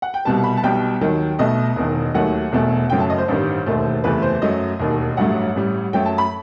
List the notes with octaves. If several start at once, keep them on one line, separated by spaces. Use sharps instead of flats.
F#5
G5
C2 B2 G3 A5
B5
A5
B1 B2 G3 G5
D#2 D#3 F#3
B1 B2 A3 D#5
E1 E2 D#3
D#2 D#3 F#3 A3 F#5
E1 E2 B2 A3
F#1 F#2 F#3 A3 G5
A5
D#5
C5
A1 G2 D#3 G3
E1 D#2 D#3 A3
F#1 E2 C3 E3 A3 B4
C5
F#2 F#3 A3 D#5
E1 D#2 D#3
A1 G2 F#3 A3 F#5
A1 A2 G3
F#2 F#3 A3 G5
A5
B5